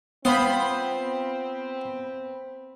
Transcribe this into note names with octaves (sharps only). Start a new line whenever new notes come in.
B3 C4 F4 C5 G5 B5 D#6